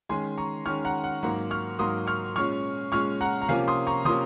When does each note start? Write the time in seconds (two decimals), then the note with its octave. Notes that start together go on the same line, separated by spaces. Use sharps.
0.09 D#3 G#3 C#4 G#5 C6
0.38 A#5 C#6
0.66 D#3 G#3 C#4 C#6 F6
0.85 F#5 A#5
1.04 F#5
1.23 G#2 F#3 A#3 F#5
1.51 C#6 F6
1.79 G#2 F#3 A#3 C6 D#6
2.07 C#6 F6
2.36 A#2 G#3 C#4 C#6 F6
2.92 A#2 G#3 C#4 C#6 F6
3.21 F#5 A#5
3.42 A#5
3.49 C3 F3 A#3 C#4 F5 G#5
3.68 C6 D#6
3.87 A#5 C#6
4.05 C3 F3 A#3 C#4 C6 D#6